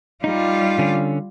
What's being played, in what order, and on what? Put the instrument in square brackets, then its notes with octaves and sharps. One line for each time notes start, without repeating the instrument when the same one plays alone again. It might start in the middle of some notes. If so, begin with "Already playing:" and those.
[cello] G3 F4 [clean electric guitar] D#4
[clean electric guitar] D3 C#4